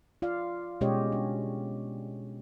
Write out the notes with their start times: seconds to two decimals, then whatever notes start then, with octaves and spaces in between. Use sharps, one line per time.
0.22 F4 D5 F5
0.81 B2 G#3 C#4 G4 C#5 D#5
1.12 D4